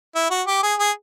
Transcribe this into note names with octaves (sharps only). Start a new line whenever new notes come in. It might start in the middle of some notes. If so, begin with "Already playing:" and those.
E4
F#4
G4
G#4
G#4